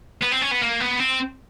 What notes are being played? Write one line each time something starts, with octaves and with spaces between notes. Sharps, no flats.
B3
C4
C#4
B3
A#3
B3
C4